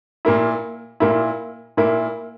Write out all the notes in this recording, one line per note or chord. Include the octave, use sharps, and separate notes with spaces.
A#2 A#3 E4
A#2 A#3 E4
A#2 A#3 E4